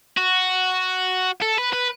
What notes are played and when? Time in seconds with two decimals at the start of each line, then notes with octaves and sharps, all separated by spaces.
0.17 F#4
1.42 A4
1.58 B4
1.73 B4